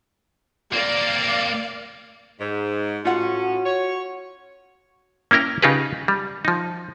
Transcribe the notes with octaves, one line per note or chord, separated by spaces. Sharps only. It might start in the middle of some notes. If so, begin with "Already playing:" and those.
A#3 C4 D5 F5
G#2
A2 C#4 F4 F#4 F#5
C#5
A#3 C#4 E4 A#4 G5
C#3 D#4 F4 G4 G#4 B4
G3
F3 D#4